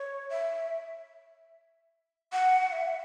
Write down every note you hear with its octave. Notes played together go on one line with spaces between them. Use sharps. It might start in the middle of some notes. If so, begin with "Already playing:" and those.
Already playing: C#5
E5
F#5
E5